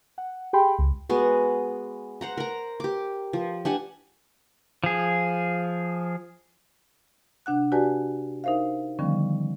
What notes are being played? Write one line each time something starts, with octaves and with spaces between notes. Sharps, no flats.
F#5
G4 G#4 G5 B5 C6
C#2
G#3 B3 F#4
C5 F#5 A#5
A#4 A#5
G4 D6
F3
D4 G4 F#5 G#5
F3 G#4
C3 D4 F#5 F#6
F#4 G4 B4 D5 G#5 A5
D#4 A#4 C5 E5 F5
D3 D#3 F3 G3 B3 C#4